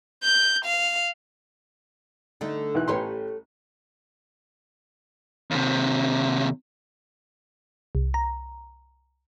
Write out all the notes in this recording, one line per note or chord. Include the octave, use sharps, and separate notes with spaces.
G6
F5
D3 A3 D#4
B1 E3 F#6
A1 A3 G4 B4 C#5 C6
D#2 C3
C2
A#5